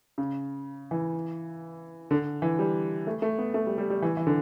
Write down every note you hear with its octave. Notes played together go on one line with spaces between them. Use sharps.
C#3
E3
D3
E3
G3
A3
A3
B3
A3
G3
G3
G3
E3
E3
D3